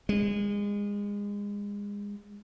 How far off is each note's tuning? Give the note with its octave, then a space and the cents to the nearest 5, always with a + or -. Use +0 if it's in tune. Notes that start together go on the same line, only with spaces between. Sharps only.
G#3 -30